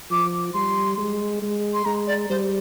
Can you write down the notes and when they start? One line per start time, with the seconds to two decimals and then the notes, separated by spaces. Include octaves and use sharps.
0.11 F3 D6
0.54 G3 C6
0.98 G#3
1.42 G#3
1.74 C6
1.85 G#3 A#5
2.07 D5
2.30 G3 C5